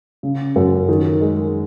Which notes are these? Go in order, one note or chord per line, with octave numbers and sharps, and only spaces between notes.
C#3
F#2
D#3
G#3